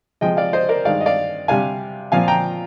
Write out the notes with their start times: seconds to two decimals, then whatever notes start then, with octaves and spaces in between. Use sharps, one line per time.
0.21 C3 F3 G#3 D#5 G5
0.37 D5 F5
0.53 C5 D#5
0.69 A#4 D5
0.85 G2 D#3 G#3 D5 F5
1.01 D#5
1.06 D5 F5
1.48 C3 G3 D4 F5 G#5
2.12 A#2 F3 C4 F5 G#5
2.28 G5 A#5